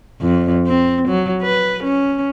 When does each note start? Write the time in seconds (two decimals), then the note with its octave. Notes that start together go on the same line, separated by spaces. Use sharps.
0.21 F2
0.67 C4
1.09 F#3
1.42 B4
1.84 C#4